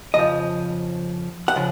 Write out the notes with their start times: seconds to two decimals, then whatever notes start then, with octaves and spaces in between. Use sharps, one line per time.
0.14 F2 C#3 F3 D#5
1.48 F#5
1.56 C#3 F3